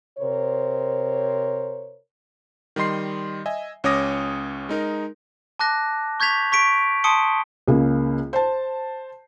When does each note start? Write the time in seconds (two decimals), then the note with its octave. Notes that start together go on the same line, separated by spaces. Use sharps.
0.19 C3 A#4 C5 C#5
2.76 D#3 G3 D#5 C6 C7
3.46 D#5 E5 G#5
3.84 C#2 C#4 C#5 D6 D#6 A#6
4.69 G#3 D#4 A#4
5.59 A5 D6 F#6 A#6
6.20 C#6 G6 G#6 B6 F7
6.52 C#6 B6 D7
7.04 A5 C6 D#6 C#7 D7 G7
7.68 C#2 C#3 A#3
8.33 C5 A5